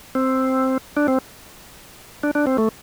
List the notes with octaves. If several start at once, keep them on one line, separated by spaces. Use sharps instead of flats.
C4
D4
C4
D4
D4
C4
A3